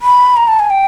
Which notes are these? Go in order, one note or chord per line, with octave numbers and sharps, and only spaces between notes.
B5
A#5
A5
G#5
G5